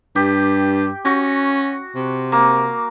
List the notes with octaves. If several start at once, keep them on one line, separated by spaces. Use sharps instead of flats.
G2 G4
C#4 F#4
C3
A#3